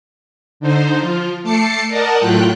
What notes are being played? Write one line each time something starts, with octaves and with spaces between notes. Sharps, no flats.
D3 D#4 C5
F3 F4
A3 A5 D6 C7 C#7
A#4 D5 D#5 F#5 A5
A2 F#3 A3 F4 G5 F#6